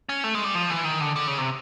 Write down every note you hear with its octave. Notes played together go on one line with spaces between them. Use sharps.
C#4
A3
G#3
G3
F3
E3
D#3
D3
D3
C#3
C3